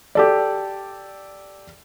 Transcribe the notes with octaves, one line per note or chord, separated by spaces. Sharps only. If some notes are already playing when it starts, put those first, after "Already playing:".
G4 A4 D5